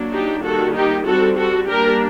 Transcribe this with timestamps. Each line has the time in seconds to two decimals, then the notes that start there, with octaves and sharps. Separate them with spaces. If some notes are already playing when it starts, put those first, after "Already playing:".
Already playing: F#3 A#3 D4
0.12 D#4 G4
0.44 D#3 G3 A#3 F#4 A4
0.75 D#4 G4
1.06 G3 C4 F#4 A4
1.37 F#4 A4
1.68 G3 A#3 D4 G4 A#4